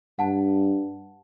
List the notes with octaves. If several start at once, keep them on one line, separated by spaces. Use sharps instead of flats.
G2 F#5 A5